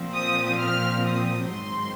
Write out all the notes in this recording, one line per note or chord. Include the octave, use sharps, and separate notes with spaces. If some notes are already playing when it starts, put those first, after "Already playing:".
Already playing: A#2 F3 C4
D#6
F6
D#6
G#2 D#3 F#3 C4 C6